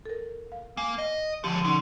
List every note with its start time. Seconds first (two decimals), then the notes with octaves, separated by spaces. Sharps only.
0.05 A4 A#4
0.52 F5
0.77 A#3 G#5
0.98 D#5
1.44 C#2 D3 F3 G4
1.64 D3 C#4 D#4